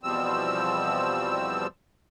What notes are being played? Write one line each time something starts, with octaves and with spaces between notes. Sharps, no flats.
E2 B2 F3 G3 C4 E6